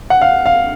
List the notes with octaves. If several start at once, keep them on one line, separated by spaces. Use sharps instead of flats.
F#5
F5
F5